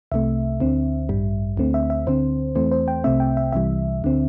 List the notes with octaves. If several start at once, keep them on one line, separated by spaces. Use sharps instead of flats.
C2 C3 A3 E5
D2 D3 C4
A1 G2 G3
D2 D3 A3 C4
E5
E5
D2 D3 C4 C5
E2 E3 A3 C4 C5
C5
G5
C2 C3 A3 C4 E5
G5
E5
C2 C3 E3 G3 E5
D2 D3 C4